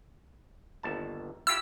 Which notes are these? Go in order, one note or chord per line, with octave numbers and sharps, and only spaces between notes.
G1 D#2 A5
E4 F4 G4 E6